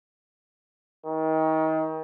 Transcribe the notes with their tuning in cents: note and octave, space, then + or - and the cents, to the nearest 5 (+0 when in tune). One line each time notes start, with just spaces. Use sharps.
D#3 +30